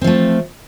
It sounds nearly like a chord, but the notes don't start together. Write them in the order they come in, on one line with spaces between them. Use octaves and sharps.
C4 F3 A3